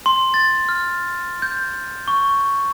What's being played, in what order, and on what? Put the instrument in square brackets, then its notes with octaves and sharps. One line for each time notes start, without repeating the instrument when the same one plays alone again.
[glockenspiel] C6
A6
F6
G6
C#6